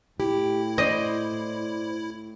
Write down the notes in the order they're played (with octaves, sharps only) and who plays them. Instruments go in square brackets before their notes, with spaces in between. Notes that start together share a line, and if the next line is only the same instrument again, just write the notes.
[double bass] A2 [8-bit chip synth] E4 [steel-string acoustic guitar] G4
[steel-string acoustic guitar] C5 D5 [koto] D#5